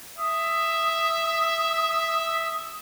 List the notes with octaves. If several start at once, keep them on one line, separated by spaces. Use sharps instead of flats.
E5 D#6